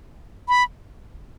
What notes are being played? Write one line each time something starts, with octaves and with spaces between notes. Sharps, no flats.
B5